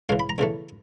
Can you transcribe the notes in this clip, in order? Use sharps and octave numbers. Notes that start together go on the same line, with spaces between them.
C#2 C#3 E3 F5
B5
A#5
E2 C#3 E3 A3